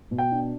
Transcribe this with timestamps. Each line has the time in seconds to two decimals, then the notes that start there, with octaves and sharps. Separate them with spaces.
0.11 B2
0.18 G5
0.32 D4